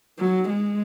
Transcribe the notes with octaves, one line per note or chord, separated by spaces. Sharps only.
F#3
G#3